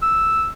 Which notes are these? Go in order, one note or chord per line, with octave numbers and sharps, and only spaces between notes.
E6